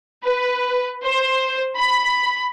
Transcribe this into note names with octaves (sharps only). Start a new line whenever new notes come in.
B4
C5
B5